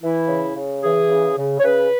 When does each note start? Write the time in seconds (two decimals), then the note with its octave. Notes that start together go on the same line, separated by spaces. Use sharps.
0.01 E3 E4
0.28 C#3
0.56 C#3
0.82 E3 G#4
1.10 C#3
1.37 C#3
1.59 C#5
1.64 C#3 B4